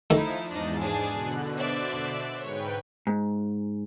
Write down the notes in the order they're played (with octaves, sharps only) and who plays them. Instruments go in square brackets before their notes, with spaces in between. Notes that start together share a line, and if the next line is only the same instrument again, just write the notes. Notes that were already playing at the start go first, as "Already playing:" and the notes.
[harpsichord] D#3 A3 [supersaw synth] F3 [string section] D#4 E4
[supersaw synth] E2 G#2 A5 [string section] D4 D#4
[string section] D4 G#4
[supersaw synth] B2 D3 F#6
[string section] C5 D5 E5
[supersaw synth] G#2 B4 G5 [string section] C#5
[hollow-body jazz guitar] G#2